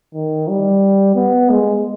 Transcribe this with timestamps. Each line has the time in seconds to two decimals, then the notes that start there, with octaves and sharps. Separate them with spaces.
0.14 D#3
0.48 G3
1.15 B3
1.50 G#3